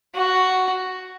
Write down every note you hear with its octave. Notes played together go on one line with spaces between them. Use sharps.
F#4